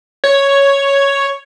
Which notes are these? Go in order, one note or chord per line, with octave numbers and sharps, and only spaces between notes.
C#5